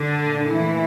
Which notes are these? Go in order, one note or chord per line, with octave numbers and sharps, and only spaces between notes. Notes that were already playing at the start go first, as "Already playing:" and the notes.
Already playing: D3 D4
A#2 F3 A3
E3 E4